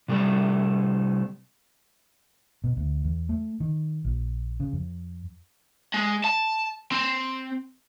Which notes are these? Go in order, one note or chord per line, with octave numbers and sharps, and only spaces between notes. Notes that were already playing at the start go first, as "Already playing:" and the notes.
C3 G3 A3 C4 D5
B2
D2
E2
A3
D#3
A#1
C#3
F2
G#3
A5
C4